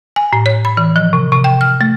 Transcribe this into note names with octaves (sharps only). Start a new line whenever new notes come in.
G#5
A2
C#5
B5
E3
F3
C3
C3
G5
F6
A3